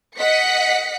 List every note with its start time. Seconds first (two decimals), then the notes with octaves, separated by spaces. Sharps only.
0.18 D#5 F#5 B6 C#7